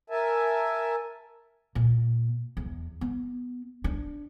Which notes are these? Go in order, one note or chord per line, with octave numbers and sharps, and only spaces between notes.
A#4 E5 G#5 A5
A#2
E2
B3
D4